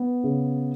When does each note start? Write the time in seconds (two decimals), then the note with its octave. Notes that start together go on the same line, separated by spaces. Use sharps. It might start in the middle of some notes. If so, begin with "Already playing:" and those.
Already playing: B3
0.24 C#3